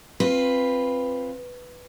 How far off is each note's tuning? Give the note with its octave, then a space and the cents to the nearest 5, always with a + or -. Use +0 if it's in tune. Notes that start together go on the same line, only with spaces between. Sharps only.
C4 +15 F4 +0 B4 +0